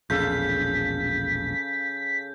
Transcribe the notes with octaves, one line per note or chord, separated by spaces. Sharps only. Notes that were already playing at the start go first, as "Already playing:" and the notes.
E1 A#1 C#3 A4 F5 G6 B6